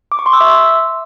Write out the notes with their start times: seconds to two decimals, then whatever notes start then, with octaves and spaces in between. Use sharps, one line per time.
0.12 D6
0.19 C#6
0.26 C6
0.33 E6
0.41 E5